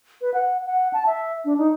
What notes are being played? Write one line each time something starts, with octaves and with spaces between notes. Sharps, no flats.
B4
F#5
F#5
A5
E5
D4
D#4